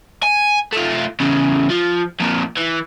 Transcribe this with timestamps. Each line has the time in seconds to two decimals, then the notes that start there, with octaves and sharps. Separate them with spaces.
0.23 G#5
0.73 A3 F4
1.20 E2 C#3
1.70 F3
2.20 F2 A#2
2.57 E3